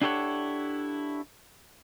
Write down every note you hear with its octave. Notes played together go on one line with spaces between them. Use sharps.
D4 E4 G4 A4 C#5 F#5